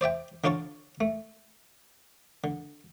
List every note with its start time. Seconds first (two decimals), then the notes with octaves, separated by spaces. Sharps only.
0.01 C5 D5 E5 G5
0.44 D3 D4 F4 C#5 A5 C#6
1.01 A3
2.44 D3